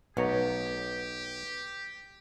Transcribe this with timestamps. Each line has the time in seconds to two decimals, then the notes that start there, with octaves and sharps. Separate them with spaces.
0.17 B1 B3 G4 C#5 A#5